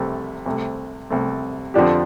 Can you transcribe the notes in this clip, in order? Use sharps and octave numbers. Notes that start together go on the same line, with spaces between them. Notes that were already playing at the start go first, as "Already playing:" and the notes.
Already playing: C2 C3 A3
C2 C3 A3
C2 C3 A3
F2 D3 F3 D4 G4